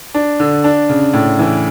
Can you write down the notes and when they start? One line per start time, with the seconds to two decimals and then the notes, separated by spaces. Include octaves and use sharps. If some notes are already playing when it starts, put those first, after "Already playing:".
0.14 D4
0.40 D3
0.64 D4
0.89 C#3
1.13 A2
1.39 E3